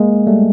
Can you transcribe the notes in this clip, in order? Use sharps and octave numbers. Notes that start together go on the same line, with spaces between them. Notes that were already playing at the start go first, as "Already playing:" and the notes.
Already playing: G#3 A#3
G3 A3